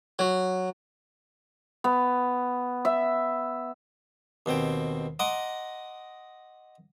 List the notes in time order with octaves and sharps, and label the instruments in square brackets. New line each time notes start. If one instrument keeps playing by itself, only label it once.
[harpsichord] F#3
[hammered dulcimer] B3
E5
[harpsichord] D#2 B2 C4 G5
D#5 F#5 A#5 C6 D6 D#6